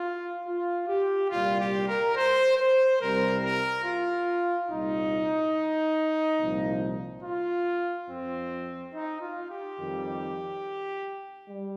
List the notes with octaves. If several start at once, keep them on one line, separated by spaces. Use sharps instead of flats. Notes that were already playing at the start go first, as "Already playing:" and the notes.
Already playing: F4
F4
G4
C2 A#2 G3 F4
G4
A#4
C5
C5
C2 C3 G3 A#4
A#4
F4
C2 A#2 G3 D#4
C2 A#2 F3
F4
F2 F3 C4
D#4
F4
G4
F2 D#3 G3
G3